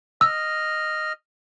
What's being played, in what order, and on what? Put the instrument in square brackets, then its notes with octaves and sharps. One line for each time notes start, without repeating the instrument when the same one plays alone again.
[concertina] D#5 F6 [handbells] E6